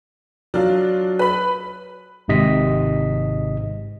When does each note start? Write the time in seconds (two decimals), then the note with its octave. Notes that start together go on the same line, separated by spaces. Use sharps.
0.54 F#3 D4 F4
1.19 B4 B5
2.28 G#1 G#2 C3 D#5 B6